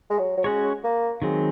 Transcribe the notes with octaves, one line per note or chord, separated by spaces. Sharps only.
G#3
F#3
F#3
G#3 C#4 F#4 C#5
A#3
D#3 F#3 G#3 C4